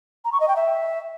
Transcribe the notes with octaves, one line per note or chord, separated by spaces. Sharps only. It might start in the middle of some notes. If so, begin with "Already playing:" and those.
A#5
C#6
D#5
G5
E5